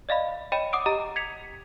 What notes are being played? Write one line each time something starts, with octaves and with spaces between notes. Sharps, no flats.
D5 D#5 F5 B5
C#5 D#5 G5 B5 D#7 E7
F#5 D6 D#6 D7
G4 D#5 A#5
G#6 B6 C#7 F7